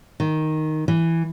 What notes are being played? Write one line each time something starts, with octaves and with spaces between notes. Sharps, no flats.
D#3
E3